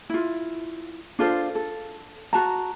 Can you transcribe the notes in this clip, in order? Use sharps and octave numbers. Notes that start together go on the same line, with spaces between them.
E4 F4
D4 F4 A4 C5
A4
F#4 A5 A#5